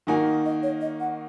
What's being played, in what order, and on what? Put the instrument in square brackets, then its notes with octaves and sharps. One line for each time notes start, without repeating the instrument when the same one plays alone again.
[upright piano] D#3 A#3 D#4 F#4 [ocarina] G#5
[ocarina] D#5
C#5
D#5
F#5